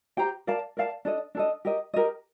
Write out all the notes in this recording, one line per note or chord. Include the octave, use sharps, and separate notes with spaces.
G4 C5 G5 A#5
A#4 D5 F5 A5
A#4 D5 F5 A5
D4 A4 D#5
D4 A4 D#5
G4 A#4 D#5
G4 A#4 D#5